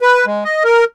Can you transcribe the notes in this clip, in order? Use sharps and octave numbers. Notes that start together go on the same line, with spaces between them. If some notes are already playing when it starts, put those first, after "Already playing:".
B4
G#3
D#5
A#4